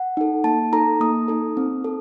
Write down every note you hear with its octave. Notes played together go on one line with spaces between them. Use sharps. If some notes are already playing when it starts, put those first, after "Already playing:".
Already playing: F#5
D#4 A4
A#3 A5
D#4 A4 A#5
A#3 D#6
D#4 A4
C4
A4